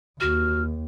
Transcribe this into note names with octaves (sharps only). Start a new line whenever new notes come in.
D#2 F#4 F6